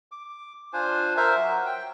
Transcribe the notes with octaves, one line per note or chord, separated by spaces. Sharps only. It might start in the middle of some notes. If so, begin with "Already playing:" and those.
D6
D4 F4 C5 G#5
A#4 C5 E5
F#3
G5